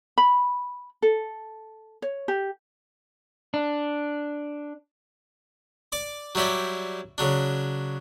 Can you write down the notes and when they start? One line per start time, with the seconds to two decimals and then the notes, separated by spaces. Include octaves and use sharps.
0.18 B5
1.02 A4
2.02 C#5
2.28 G4
3.54 D4
5.92 D5 D6
6.35 F#3 G3 E4 G4 D5
7.18 C#3 F#3 D4